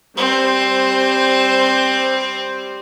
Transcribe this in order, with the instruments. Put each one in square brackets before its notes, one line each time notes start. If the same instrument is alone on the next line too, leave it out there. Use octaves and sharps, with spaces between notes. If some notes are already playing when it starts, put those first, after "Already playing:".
[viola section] G3 C5 [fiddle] C4